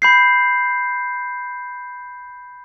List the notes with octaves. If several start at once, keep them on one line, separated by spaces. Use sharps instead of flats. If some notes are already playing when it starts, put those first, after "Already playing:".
B5 G6 C7